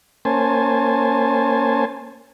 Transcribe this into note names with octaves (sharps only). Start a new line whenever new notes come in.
A#3 C#4 C5 G#5 A5